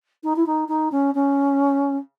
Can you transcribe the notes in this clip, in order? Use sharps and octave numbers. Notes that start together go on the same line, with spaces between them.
D#4
E4
D#4
D#4
C#4
C#4